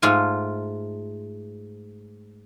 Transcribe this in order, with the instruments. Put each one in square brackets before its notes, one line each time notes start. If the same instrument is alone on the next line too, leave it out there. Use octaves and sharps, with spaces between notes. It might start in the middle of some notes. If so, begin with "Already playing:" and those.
[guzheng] G#2 A3 F4 G#5